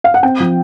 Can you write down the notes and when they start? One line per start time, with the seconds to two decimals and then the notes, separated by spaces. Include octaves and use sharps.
0.04 F5
0.14 F#5
0.23 C4 G5
0.40 F3